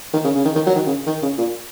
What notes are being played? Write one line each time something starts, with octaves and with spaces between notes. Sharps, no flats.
D#3
C#3
C#3
D#3
D#3
F#3
D#3
C#3
D#3
C#3
A#2